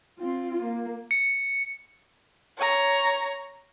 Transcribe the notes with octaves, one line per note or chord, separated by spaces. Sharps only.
C4 F4
A#3
C#7
C#5 A#5